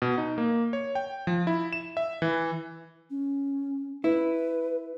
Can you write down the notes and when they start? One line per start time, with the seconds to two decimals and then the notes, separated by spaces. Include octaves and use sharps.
0.02 B2
0.18 D#4
0.38 A#3
0.73 C#5
0.95 G5
1.27 F3
1.47 E4
1.73 E7
1.97 E5
2.22 E3
3.10 C#4
4.04 E4 B4